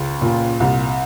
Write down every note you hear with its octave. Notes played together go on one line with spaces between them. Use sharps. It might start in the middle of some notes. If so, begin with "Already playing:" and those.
Already playing: C#2
A#2
C2